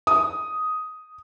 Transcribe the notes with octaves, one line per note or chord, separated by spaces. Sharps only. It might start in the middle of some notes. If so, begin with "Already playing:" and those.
D#6